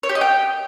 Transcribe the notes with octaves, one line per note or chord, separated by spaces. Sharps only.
C#5
G4
D#5
G5